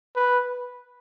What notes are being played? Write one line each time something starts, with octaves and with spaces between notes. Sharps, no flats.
B4